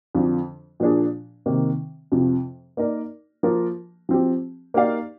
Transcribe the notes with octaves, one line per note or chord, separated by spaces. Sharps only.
F2 D3 F3
A#2 F3 A#3 D4 G#4
C3 D#3 A#3
F2 C3 F3
A#3 D#4 A#4 D5
F3 A#3 F4 A#4
F3 C4 G4
A#3 D#4 G4 D5 F5